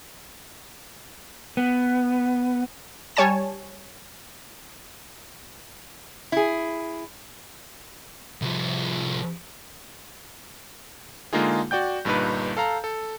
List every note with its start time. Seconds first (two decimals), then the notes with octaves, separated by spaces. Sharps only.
1.57 B3
3.16 G3 C#5 G#5 A5 E7
6.32 E4 G#4
8.42 C2 F3
11.33 D3 G#3 A#3 D#4 F4 G#4
11.71 F#4 D5 G5 G6
12.05 G1 G2 A#2 D#4 B4
12.57 A4 F5 A#5
12.84 A4